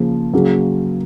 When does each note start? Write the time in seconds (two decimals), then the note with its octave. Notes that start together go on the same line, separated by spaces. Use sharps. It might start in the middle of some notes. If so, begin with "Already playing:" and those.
Already playing: C#3 F3 A#3
0.33 C#3 F#3 A#3